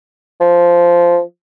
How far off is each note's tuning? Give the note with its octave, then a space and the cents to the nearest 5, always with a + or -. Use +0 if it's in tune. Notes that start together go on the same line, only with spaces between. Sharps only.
F3 -10